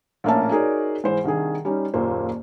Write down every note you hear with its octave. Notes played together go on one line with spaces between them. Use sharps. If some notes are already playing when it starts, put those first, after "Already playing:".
A#1 A2 A#3 C#4 E5 A5
D#4 F#4 G#4 A#4 C#5 D5
G#2 E3 C5
C2 D#3 D4 G#4
G3 C#4 D#4
F#1 D#2 A#2 A#3 C5